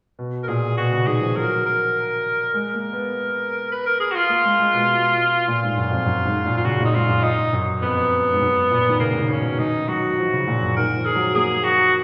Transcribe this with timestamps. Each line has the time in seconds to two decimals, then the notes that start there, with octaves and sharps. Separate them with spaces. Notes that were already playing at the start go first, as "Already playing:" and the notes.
0.19 B2
0.43 A#4
0.48 A#2 G#4
0.77 B2 F#4
0.92 C#3
1.07 D#3 G#4
1.21 F3
1.36 F#3 A#4
1.66 A#4
2.54 G#3 A#4
2.74 A#3
2.93 B3
3.71 B4
3.86 A#4
4.00 G#4
4.11 F#4
4.15 F4
4.29 A#3
4.45 G#3
4.59 G#3
4.74 B2
5.48 A#2 F4
5.63 G#2
5.77 F#2
5.91 F2
6.06 F#2
6.25 G#2
6.46 A#2
6.57 F4
6.65 C#3 F#4
6.80 A#2 D#4
6.94 G#2 F4
7.09 F#2
7.23 D#4
7.53 F#2
7.82 F2 B3
8.33 G#2
8.41 F#2
8.70 A#2
8.89 D#3
8.99 C#3 A#3
9.14 C#3
9.19 D#3
9.30 C#4
9.39 B2
9.59 D#3 D#4
9.88 F#3 F#4
10.18 F3
10.33 C#3
10.47 A#2
10.62 F#2
10.76 D#3 A#4
10.96 F3
11.06 G#4
11.15 F#3
11.35 A#3 G#4
11.64 F#4